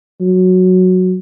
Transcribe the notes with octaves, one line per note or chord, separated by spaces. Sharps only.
F#3